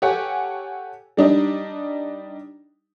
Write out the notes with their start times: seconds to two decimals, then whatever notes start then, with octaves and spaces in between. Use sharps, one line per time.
0.02 G4 A4 C#5 F#5 G#5
1.17 G3 D4 D#4